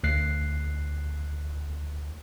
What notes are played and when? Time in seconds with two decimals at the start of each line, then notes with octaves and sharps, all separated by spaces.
0.04 D2 F#6 C7